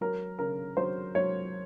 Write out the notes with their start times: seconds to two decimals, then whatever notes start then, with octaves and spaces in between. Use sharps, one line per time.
0.01 F#3 A#4
0.39 C#3 A#4
0.77 F#3 C5
1.15 F#3 C#5